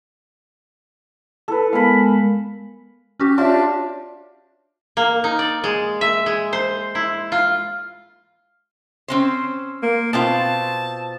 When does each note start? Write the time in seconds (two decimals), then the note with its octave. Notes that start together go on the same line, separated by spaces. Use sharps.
1.48 E4 A4 B4
1.73 G#3 B3 A#4 F5 B5
3.20 C#4 F#4 G4
3.38 D4 F4 C#5 E5 A5
4.97 A#3
5.24 D#4
5.39 D5
5.64 G#3
6.01 E5
6.26 G#3
6.53 C5
6.95 E4
7.32 F4
9.08 C4 C#4 C5
9.83 A#3
10.13 B2 C4 F4 A5